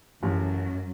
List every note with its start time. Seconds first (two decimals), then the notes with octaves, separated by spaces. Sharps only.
0.23 A1 F#2 F#3